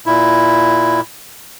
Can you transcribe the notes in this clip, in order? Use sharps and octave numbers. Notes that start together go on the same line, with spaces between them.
A#2 E4